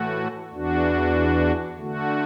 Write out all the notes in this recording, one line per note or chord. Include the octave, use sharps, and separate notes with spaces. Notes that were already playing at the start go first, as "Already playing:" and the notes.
Already playing: A2 E3 A3 F#4
E2 E3 D4 F#4
D3 A3 F#4